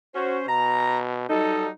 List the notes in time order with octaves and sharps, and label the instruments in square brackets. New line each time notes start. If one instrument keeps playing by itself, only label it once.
[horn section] C#4 C5 [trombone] F#4
[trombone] B2 [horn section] A#5
[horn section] F#3 G3 D#4 [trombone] A4